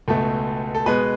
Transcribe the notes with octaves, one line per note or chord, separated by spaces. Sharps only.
C#2 B2 A3 A4
A4
B2 G#3 B3 B4